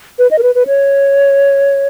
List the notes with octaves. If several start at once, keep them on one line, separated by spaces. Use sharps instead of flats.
B4
D#5
A#4
B4
B4
C#5